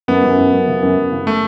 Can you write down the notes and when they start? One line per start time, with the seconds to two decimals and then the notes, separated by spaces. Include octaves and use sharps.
0.08 F#2 B3
0.23 F#2
0.38 F#2
0.53 F#2
0.68 C#3
0.82 F#2
0.97 F#2
1.11 C#3
1.27 A3